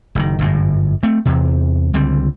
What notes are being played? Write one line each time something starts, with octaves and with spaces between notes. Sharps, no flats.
F#1 C3 D#3
G1 F#2 A2
A3 C4
E2 C3
C#2 D3 G3 C4